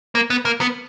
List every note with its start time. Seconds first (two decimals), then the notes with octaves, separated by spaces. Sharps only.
0.15 A#3
0.30 B3
0.45 A#3
0.61 B3